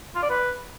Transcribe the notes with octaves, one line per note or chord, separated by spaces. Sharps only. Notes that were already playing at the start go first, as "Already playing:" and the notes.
F4
D5
B4